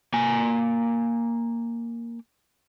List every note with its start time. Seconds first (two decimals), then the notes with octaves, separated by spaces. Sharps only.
0.14 A#3 G#5